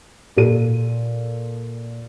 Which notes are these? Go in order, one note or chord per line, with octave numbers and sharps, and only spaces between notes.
A#2 A4 D#7